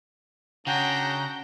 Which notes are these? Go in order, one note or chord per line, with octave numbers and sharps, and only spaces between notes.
C#3 D4 F#4 G5 A#5